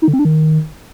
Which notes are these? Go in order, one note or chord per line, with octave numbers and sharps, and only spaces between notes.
D#4
D3
C4
D4
D#3